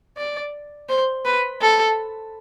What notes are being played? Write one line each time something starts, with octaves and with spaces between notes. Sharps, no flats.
D5
C5
B4
A4